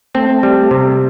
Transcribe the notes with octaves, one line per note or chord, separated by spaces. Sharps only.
A3 C4
G3
C3